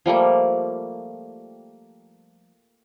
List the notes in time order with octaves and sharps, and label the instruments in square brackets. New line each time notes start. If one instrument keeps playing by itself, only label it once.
[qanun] F3 G3 A3 A#3